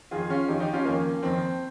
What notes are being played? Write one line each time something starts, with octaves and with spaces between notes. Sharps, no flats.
F2 D#3 F4 G#4
C#4 F4
F2 D#3 D#4 G4
D#4 G4
C#4 F4
F2 D#3 A#3 C#4
F2 D#3 C4